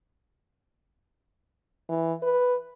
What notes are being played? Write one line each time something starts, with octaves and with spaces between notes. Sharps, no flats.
E3
B4